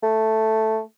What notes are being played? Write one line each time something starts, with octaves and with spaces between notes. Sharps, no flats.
A3